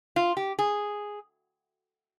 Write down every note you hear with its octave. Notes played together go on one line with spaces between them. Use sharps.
F4
G4
G#4